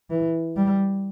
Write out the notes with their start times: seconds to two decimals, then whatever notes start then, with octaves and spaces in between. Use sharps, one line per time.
0.10 E3
0.56 G3